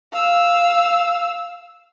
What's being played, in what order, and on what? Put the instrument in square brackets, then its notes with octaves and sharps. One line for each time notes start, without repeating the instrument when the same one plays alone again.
[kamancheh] F5 E6